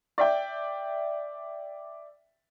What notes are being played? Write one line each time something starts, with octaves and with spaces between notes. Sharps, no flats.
D5 E5 G5